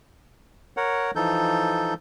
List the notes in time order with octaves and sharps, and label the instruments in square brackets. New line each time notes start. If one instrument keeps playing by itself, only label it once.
[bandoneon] A#4 C#5 F#5
E3 F3 D#4 A4 G6